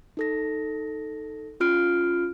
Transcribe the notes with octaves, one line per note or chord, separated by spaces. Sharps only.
D#4 A4 A#6
C#4 F4 F6 D7